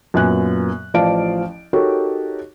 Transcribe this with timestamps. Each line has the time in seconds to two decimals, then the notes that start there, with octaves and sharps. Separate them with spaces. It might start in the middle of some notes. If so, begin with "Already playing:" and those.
0.14 F#2 A#2 B3 G#5 F#6
0.94 A1 F3 D5 F5 A5 D7
1.73 D#4 F#4 G4 A4 A#4 C#5